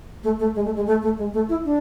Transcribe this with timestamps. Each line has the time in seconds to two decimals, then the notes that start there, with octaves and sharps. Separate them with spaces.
0.23 A3
0.39 A3
0.55 G#3
0.65 A3
0.75 G#3
0.86 A3
1.02 A3
1.17 G#3
1.33 A3
1.49 E4
1.64 D4